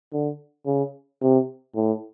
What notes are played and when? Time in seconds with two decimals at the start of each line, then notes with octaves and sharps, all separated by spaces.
0.13 D3
0.66 C#3
1.22 C3
1.76 A2